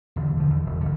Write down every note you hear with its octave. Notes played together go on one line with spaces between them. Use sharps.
B1 E2 D3
D3 F3
E2
E1
G1 D3